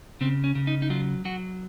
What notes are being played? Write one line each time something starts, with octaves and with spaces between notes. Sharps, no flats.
C#3 C4
C#4
C#3
D#4
D#4
F#3 F4
F#3 F#4